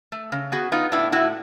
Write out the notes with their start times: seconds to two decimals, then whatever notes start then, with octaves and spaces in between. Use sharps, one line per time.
0.12 A3
0.32 C#3
0.52 B3 F#4 G#4
0.72 B3 D#4 F4
0.92 A2 D4 E4
1.12 A2 E4 F#4